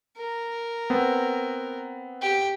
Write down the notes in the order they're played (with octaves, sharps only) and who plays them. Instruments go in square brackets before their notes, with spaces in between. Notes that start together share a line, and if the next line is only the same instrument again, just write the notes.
[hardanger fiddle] A#4
[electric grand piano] B3 C4
[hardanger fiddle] G4